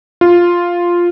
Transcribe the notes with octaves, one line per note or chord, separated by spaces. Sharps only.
F4